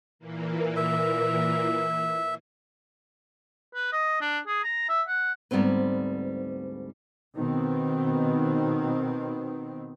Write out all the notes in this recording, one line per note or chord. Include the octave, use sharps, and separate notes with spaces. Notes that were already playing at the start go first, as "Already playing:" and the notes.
A#2 E3 A#3
E5
B4
D#5
D4
G#4
A#5
E5
F#5
D2 G#2 G3 B3 C4 B4
B2 D#3 B3 C4